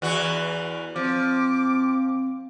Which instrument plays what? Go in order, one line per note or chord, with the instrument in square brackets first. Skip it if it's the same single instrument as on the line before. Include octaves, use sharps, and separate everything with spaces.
[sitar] E2 E3 F#4
[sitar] F3 [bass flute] C4 [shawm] D6